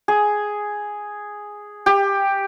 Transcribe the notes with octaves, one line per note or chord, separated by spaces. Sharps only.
G#4
G4